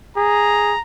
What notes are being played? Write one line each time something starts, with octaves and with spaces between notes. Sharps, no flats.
G#4 A#5